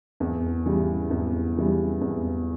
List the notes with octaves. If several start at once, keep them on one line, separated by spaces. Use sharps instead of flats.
E2
C#3 E3 G3
E2
C#3 E3 G3
E2